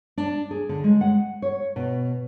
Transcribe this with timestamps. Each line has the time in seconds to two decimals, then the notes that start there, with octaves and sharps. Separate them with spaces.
0.17 D4
0.51 G#4
0.69 D3
0.84 G#3
1.01 F#5
1.42 C#5
1.76 B2